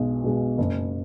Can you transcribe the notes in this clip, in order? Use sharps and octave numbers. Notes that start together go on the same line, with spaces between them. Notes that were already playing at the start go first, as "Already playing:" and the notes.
Already playing: B1 B2 G#3
B2 G#3
F#1